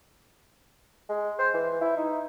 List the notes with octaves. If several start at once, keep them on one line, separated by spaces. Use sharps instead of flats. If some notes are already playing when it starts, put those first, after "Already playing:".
G#3
C5
E3
E4
D#4